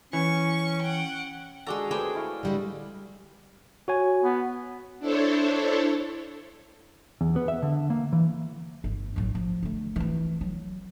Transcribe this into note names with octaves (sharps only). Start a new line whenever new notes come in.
E3 C#4 C#6
F#5 G5
G#3 D4 F#4 A4 G5 A#5
A3 D4 G#4 B4 C5 G5
E4 C#5 F5
D3 G3 G#3
F#4 C#5 G#5
B3
D4 E4 A4 C5 C#5
E2
B3
E5
D3
A#3
E3
G1
A1 F#3
F3
D3 A3
E3 C4
F#3